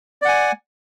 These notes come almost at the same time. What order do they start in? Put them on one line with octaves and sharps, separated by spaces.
D5 F#5 G#5